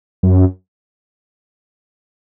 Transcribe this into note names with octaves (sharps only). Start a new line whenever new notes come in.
F#2